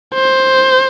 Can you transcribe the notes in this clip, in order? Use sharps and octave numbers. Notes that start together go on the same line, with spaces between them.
C5